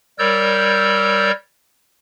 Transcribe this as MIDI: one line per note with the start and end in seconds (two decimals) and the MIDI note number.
0.19 1.31 55
0.19 1.31 70
0.19 1.31 73
0.19 1.31 74
0.19 1.31 88
0.19 1.31 91